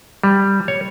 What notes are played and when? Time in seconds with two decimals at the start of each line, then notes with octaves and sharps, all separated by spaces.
0.24 G3
0.68 C#5